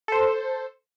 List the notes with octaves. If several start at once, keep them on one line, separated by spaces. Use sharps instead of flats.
A4 C5